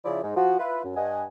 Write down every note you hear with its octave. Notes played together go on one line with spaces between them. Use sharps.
C#3 F3 E4 D5
G#2 G#3
F3 F4 F#4
E4 F4 B4
F#2
G2 D#5 F#5 G#5